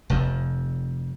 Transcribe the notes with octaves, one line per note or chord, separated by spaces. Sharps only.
F1 F2